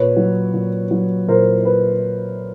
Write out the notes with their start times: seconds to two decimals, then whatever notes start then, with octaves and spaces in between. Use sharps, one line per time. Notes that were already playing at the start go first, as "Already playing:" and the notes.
Already playing: A#2 B4 C#5
0.17 F#3
0.54 A#2
0.91 F#3
1.28 A#2 A#4 C5
1.65 B4